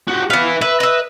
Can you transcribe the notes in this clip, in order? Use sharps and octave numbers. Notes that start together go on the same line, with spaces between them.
F#4 G4
B3 B4 E5 F5
B4 E5
D#5 E5